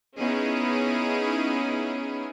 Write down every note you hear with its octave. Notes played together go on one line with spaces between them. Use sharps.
B3 C#4 D#4 E4 G#4